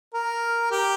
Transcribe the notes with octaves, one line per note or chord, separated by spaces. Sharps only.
A#4
G4